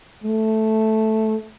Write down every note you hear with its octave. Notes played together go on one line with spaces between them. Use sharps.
A3